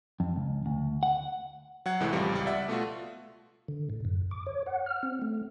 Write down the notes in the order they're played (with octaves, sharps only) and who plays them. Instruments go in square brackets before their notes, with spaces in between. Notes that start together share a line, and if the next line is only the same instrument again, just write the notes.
[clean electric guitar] F2
C#2
D2
F#5
[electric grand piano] F#3 F#5 G#6
C2 A2 E3 G#3
A1 F2 F3 G3
C#2 G3
D5 E5 F#5
B2 A3 F4 F#4
[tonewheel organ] D3
A2
F#2
D6
C#5
F#5
F6
C4
A3